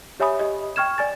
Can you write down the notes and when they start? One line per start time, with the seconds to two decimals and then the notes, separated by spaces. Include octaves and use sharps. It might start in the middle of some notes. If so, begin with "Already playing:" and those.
0.20 G4 C#5 E5 G#5 B5 D#6
0.39 G4 D#5
0.76 G5 C#6 F6 G#6 E7
0.98 D5 G#5 A6